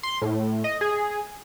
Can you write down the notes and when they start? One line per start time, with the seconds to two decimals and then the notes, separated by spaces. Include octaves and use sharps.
0.03 C6
0.22 A2
0.64 D#5
0.81 G#4